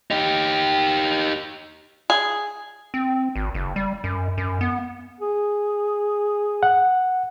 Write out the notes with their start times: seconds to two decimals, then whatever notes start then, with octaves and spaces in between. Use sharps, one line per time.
0.11 D#4 G4
2.10 G#4
2.94 C4
3.36 G#1
3.55 F#1
3.76 G3
4.04 F#2
4.38 F#2
4.61 B3
5.21 G#4
6.63 F#5